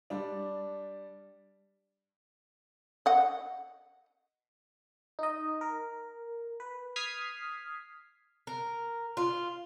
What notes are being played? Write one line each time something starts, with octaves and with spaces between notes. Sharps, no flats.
G3 D4
D#5 F#5
D#4 D#5
A#4
B4
D#6 F6 G#6 B6 C7
A#4
F4